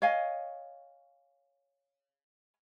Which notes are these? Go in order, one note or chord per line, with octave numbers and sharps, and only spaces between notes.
C#5 D#5 F5 G#5